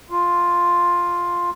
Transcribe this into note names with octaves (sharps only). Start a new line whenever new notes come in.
F4